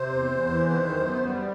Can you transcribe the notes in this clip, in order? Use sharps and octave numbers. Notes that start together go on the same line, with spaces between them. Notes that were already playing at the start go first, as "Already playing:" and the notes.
Already playing: C3 C5
E2
E2
E3
D#3
F#2
B3
G3